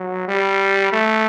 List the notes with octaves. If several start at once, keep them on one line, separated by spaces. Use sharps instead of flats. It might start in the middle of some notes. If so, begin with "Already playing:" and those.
Already playing: F#3
G3
A3